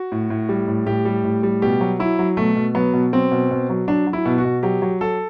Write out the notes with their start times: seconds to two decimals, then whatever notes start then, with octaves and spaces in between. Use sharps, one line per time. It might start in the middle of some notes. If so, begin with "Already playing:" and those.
Already playing: F#4
0.12 A2
0.30 A2
0.49 G3
0.68 A2
0.86 A2 G4
1.05 G3
1.24 A2
1.43 G3
1.62 B2 G4
1.81 F#3
1.99 F#3 E4
2.19 F#3
2.37 B2 A3
2.56 B2
2.75 F#3 B3
2.93 B2
3.13 F#3 C4
3.32 B2
3.51 B2
3.70 F#3
3.88 F#3 D4
4.07 F#3
4.13 E4
4.25 B2
4.38 F#4
4.45 B2
4.63 F#3 G4
4.82 F#3
5.01 F#3 A4